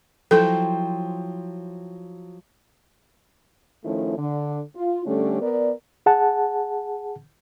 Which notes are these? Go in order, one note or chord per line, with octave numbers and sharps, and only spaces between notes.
F3 F#3 E4 A4 C5 G5
D#3 F3 A3 C#4 E4
D3
F4
D3 G3 A3 C#4
B3 A#4 D5
G#4 F#5 A5